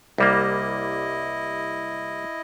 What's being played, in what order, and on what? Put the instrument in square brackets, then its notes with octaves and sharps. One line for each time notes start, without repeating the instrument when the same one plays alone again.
[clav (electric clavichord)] C2 G3 A#3 [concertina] E4 D#5